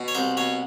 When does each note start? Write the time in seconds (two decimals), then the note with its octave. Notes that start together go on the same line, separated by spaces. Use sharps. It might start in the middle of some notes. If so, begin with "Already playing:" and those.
Already playing: B2
0.08 C#5
0.15 C2 C5
0.37 B2 C#5